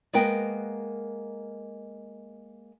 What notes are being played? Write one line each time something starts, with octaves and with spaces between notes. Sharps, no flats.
G#3 A#3 B3 A#4 B4 G5